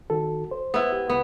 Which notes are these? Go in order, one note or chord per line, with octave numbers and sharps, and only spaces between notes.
D#3 F#4 A4
C5
B3 E4
G4
C#2 B3